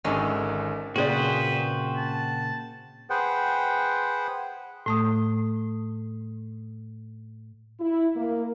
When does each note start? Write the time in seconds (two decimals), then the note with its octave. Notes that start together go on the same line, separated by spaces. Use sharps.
0.04 G#1 G#2 D3 D#3 C#4
0.96 A#2 C#3 C4 F#4 G#4 B4 C5 D5
1.97 A5
3.10 G#4 B4 C5 F#5 G5
4.86 A2 A3 D#6
7.80 E4
8.17 A#3